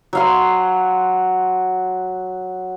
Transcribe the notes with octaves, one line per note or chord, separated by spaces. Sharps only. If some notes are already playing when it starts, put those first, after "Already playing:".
F#3 F5 C6